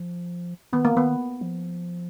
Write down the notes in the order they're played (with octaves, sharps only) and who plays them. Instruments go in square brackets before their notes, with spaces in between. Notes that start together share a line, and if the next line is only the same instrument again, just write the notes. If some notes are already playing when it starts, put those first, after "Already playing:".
Already playing: [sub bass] F3
[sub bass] D#3 [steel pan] B3
[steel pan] A#3
[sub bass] D#3 [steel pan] B3
[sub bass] F3